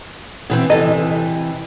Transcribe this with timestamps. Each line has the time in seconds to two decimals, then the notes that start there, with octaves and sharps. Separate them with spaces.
0.50 B2 E3 C4
0.70 C3 E3 A4 D#5